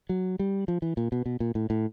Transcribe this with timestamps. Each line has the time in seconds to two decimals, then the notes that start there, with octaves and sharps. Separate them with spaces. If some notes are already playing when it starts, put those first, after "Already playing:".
0.09 F#3
0.39 G3
0.68 F3
0.82 E3
0.97 A#2
1.12 B2
1.26 B2
1.40 A#2
1.55 A2
1.70 A2